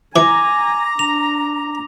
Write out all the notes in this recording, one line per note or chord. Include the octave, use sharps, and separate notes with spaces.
E3 G#5 A#5 D6
D4 F7